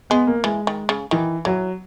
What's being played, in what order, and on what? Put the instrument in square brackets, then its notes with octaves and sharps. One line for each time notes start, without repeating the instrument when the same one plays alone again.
[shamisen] G#3 [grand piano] B3
[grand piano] A#3
[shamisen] E3 [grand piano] G#3
[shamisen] D#3
C#3
[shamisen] D#3 [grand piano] E3
[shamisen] E3 [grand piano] F#3